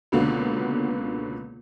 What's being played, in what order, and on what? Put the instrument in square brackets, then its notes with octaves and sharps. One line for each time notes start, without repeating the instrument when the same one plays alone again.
[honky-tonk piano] C#2 B2 D3 A#3 B3 C#4